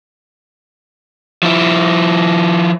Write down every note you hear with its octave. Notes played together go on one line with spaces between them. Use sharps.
F3 E4